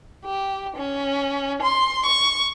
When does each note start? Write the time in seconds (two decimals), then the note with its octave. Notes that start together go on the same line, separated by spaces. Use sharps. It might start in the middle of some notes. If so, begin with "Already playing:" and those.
0.25 G4
0.77 C#4
1.62 C6
2.06 C#6